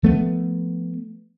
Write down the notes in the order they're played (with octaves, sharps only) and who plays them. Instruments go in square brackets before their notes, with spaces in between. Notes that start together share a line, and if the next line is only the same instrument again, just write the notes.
[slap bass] F3 A3 B3